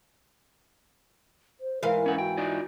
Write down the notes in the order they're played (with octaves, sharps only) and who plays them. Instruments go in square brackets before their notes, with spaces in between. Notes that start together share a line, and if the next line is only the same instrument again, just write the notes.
[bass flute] C5
[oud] G#2 E3 F5 [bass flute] A#4
[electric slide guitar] C#4 F#5
[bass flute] F#4 [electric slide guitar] G5
[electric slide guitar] D#4 F4 D5